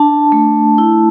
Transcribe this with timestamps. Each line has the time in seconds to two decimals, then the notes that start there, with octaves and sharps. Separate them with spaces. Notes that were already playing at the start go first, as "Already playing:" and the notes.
Already playing: D4 A5
0.32 A3
0.78 E4